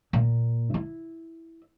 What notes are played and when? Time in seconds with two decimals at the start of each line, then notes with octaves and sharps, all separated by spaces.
0.13 A#2
0.74 E4